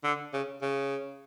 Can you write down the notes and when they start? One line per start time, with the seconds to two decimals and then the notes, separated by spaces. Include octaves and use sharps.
0.04 D3
0.33 C#3
0.62 C#3